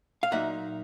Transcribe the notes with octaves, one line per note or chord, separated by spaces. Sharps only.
F5
A#2 F#3 A#3 D#4 E5 F#5